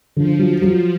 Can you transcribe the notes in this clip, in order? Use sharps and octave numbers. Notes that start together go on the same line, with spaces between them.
D3 F3
F#3
F#3